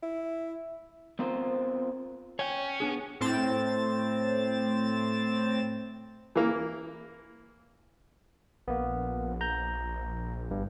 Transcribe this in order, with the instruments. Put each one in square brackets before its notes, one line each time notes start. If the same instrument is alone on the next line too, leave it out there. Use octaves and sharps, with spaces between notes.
[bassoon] E4
[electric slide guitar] B3 C4 F4 A#4 C5
[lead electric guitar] C#4 [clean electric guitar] C#5 G5
[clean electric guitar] B3 D4 G#4
[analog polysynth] A2 C4 A6 E7
[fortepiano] E3 A#3
[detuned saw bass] A#1 [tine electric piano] A#3 B3
[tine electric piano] A#5 G6
[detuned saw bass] G1 [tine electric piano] G2